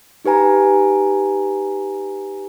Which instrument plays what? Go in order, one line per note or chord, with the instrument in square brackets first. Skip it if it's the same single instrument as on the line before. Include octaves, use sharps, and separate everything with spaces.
[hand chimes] D#4 G4 B4 G#5 A#5